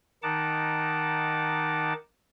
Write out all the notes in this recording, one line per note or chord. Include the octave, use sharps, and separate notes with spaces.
D#3 D#4 F#5 A5 D6